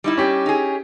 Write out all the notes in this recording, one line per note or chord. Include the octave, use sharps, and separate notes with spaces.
G3 D#4 E4
C#4 G4
D#4 G#4